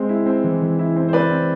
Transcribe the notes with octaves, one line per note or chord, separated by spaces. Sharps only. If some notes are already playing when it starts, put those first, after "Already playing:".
Already playing: G#3 C4
E4
C4
E3
E3
E4
C4
C5
E4 B4 D5
C4